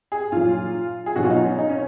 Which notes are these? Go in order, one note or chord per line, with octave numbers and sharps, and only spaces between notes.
G#4
A#2 F#3 F4
G#4
B2 F#3 F#4
F4
D#4
C#4
D#4
C#4